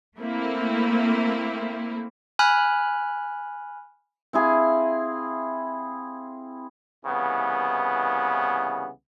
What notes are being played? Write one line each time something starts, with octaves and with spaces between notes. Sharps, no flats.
A3 A#3 C4 E4
G#5 B5 F6 F#6
C4 E4 G#4 F5
C2 C#3 E3 B3